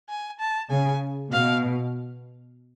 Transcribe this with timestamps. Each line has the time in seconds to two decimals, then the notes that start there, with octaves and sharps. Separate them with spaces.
0.09 G#5
0.40 A5
0.71 C#3 G#5
1.32 B2 F5